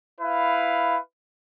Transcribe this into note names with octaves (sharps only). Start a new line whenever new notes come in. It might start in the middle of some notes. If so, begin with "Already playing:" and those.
E4 B4 F5